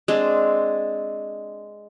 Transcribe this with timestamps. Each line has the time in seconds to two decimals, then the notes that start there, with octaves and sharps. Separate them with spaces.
0.08 G#3 C4 D4